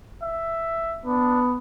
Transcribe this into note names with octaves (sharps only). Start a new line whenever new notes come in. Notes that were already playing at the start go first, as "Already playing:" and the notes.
E5
B3 D4